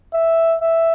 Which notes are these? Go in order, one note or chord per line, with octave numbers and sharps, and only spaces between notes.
E5
E5